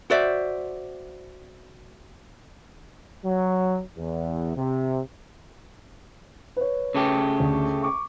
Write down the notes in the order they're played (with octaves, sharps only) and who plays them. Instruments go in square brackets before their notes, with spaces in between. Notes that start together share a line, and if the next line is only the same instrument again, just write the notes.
[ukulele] F#4 C5 D5 E5
[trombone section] F#3
E2
C3
[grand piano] B4 C#5
[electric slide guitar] C#3 A3 G4
[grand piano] D2
C#6 D6